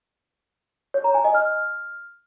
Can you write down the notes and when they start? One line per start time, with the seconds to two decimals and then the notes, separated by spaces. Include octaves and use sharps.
0.94 C#5
1.04 A#5
1.14 G#5
1.24 D#5
1.34 F6